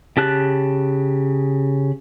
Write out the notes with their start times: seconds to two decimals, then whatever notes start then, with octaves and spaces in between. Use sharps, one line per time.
0.17 C#3 G4 A5 F#6